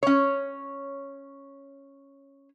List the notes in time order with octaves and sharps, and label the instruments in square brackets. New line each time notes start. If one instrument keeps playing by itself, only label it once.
[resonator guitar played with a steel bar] C#4 C#5